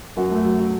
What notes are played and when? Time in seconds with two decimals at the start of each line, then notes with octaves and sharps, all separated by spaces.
0.17 F#2 F#4
0.31 A3
0.45 F#3
0.60 F#3